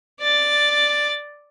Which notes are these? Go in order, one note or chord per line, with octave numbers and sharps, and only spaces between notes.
D5 A6